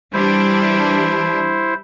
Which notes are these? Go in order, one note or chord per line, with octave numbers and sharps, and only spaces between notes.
E3 G3 D4 E4 C5